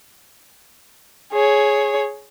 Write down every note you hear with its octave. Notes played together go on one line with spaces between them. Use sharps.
G#4 C#5